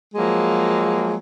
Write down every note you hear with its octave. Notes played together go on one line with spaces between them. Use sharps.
F3 F#3 G#3 A#3